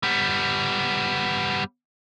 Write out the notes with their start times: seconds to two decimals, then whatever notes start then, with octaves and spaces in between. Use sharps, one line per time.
0.03 G3 B3